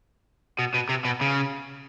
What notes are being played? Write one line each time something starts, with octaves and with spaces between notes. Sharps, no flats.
B2
B2
C3
B2
C#3